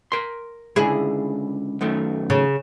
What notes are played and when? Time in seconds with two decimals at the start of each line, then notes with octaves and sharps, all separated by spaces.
0.12 A#4 C6
0.76 C#2 D3 E4 G#4
1.81 F#2 D#3 A3
2.30 C#3